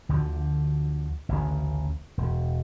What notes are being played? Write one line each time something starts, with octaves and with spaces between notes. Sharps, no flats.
D2 D3 F3
A1 D2 C#3
E1